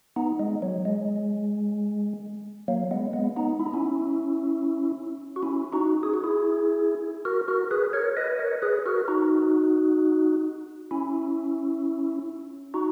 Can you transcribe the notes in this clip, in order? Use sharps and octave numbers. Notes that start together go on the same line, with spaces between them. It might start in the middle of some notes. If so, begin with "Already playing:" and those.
B3 D#4
G#3
F#3
G#3
F#3 A#3
G#3 B3
G#3 B3
B3 D#4
E4
D#4
C#4 E4
F#4
C#4 E4
D#4 F#4
G#4
F#4
E4 G#4
F#4 A#4
F#4 A#4
G#4 B4
A#4 C#5
B4 D#5
D#5
A#4 C#5
G#4 B4
F#4 A#4
D#4 F#4
C#4 E4
D#4 F#4